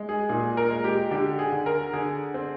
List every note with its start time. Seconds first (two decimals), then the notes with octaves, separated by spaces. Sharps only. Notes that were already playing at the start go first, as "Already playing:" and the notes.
Already playing: G#3
0.09 G#4
0.29 A#2 G#4
0.57 A#4
0.70 G#3
0.84 G4
1.11 D3 G4
1.39 G#4
1.52 D3
1.66 A#4
1.93 D3 G#4
2.34 C4